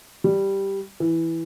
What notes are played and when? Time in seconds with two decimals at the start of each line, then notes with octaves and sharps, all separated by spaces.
0.24 G3
1.00 E3